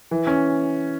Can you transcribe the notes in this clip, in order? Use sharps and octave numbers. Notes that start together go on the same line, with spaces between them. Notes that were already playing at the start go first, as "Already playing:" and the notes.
E3
C#4